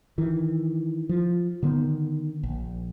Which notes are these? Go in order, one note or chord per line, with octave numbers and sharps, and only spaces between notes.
D#3 E3
F3
D3 D#3 B3
A#1